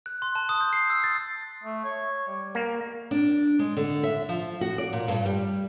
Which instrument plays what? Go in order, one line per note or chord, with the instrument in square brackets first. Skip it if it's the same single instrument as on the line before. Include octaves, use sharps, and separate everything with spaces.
[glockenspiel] F#6
C6
A5
D#6
G6
C7
E6
A6
[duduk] A3
C#5
G3
[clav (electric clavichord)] A#3
[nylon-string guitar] D4
G#3
D3
E5
F3
F#4
D5
A#2
G2
G3